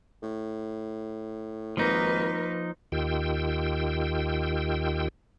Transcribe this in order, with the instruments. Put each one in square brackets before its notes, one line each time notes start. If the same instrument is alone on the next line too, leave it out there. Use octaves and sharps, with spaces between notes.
[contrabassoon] A2
[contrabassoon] G#1 [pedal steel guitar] F3 D#4 [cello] A#3 B4
[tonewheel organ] D#2 D#3 F4 G4 G5 E6